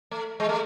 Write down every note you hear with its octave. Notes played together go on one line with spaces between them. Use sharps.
A3
G#3
A3